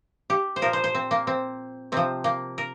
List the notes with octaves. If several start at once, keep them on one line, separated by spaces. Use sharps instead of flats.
G4
C5
A#2 F3 A#4
C5
C5
C4
A#3
C4
C3 F3 C4
A#3
A#4